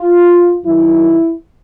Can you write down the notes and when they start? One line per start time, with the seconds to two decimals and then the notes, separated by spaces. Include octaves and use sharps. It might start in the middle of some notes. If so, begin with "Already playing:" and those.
Already playing: F4
0.65 F#2 D#3 F#3 E4